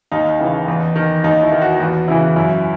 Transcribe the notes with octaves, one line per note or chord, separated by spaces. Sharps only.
D#2 D#4
C#3 E3
E2
D#3
D#2 D#4
E4
D#3
F#4
E2 F#4
C#3 E3 E4
F#2 E4